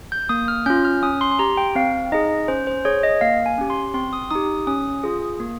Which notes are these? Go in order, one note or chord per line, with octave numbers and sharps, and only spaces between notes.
G6
A#3 D#6
F6
C#4 F4 G6
F6
C#4 D#6
C6
C6
G4 A#5
G5
C4 F5
D#4 G#4 D#5
C#4 C5
C5
G#4 C#5
D#5
A#3 F5
G#5
C#4 G4
C6
C4 C6
D#6
D#4 G4 D#6
C#4 D#6
F4 G#4
A#3